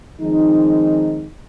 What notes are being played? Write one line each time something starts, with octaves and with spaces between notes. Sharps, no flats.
D#3 F3 G#3 C4 D#4